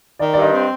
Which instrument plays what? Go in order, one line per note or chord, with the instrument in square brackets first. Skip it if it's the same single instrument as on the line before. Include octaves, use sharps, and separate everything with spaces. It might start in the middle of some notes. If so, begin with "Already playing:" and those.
[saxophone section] D#3 [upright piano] D5
[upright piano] D5
[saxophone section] G2 [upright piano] D#5
[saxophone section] C4